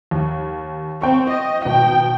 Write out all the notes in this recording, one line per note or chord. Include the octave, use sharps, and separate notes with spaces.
D#2
C4 C5 G5 C#6
D#5
G#1 B2 G5